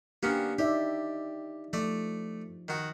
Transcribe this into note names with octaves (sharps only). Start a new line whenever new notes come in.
A#3 B3 C#4 D4 G4
D#4 G4 D5 E5
F3 A3 D5
D#3 F#4